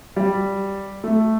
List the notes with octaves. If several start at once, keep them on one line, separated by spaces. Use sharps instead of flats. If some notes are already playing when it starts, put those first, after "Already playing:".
G3
A3